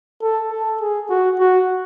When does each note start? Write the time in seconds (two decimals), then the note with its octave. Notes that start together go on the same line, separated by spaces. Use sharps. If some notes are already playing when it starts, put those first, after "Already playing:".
0.22 A4
0.51 A4
0.80 G#4
1.09 F#4
1.39 F#4